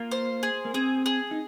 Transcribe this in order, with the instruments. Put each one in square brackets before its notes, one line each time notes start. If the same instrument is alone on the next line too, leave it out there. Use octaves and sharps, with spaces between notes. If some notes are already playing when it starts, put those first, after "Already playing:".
Already playing: [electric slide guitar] A#3 [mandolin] F4
[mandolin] C5
G#4
[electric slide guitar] A#3
[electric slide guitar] C4 [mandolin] G#4
[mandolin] G#4
[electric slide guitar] D#4